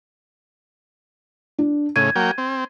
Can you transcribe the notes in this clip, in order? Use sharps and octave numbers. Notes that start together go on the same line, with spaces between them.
D4
A2 C#3 G#6 D#7
F#3 A#3 G5
C4